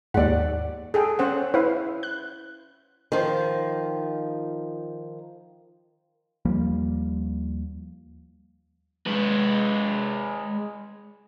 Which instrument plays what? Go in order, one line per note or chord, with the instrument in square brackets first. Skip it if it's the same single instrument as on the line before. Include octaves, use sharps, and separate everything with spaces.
[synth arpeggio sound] D#2 G#2 [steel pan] D5 F#5
[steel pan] G#4 A4 G5
C#4 C5 F#5
[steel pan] E4 [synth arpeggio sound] B4 C5 F5
[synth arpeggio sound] F#6
[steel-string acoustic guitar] D#3 F3
[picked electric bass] D#2 F3 G3 A#3
[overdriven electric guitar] G#3 B4